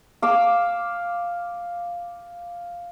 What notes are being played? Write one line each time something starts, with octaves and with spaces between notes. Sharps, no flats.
F5 D6 E6